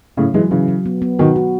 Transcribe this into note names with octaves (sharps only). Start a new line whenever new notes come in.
A2 C#3 F#3
E3 F#3 G#3
C#3 E3 F#3
F#3
B3
B3
B2 D#3 F#4
F#4